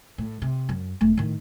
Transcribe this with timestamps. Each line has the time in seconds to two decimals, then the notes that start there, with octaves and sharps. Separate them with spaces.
0.18 A2
0.42 C3
0.69 F#2
1.01 E1 A3
1.17 A2 D#3